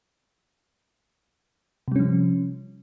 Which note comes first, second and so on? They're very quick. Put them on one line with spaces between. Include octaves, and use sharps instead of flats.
C3 G3 C#4 F3